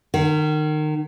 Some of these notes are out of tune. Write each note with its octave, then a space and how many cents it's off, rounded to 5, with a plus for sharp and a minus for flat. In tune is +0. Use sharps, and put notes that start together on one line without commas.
D#3 -30